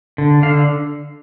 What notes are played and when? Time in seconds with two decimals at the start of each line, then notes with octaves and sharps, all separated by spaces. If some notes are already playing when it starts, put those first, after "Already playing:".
0.18 D3
0.43 D3 F5